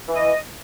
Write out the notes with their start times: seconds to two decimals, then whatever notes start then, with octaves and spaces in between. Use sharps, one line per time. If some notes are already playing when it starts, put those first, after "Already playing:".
0.08 E3
0.15 D#5